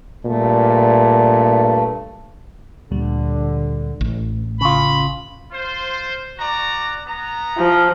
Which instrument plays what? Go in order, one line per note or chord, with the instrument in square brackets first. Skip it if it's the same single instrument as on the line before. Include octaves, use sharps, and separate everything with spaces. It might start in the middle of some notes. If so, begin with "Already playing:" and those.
[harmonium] G2 A3 [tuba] A#2
[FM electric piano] D2 A#2 G3 [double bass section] D3
[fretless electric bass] A1
[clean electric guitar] C#3 F4 [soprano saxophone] B5
[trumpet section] F4 C5
F#4 D5 A#5
B3 A#5
[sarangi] F3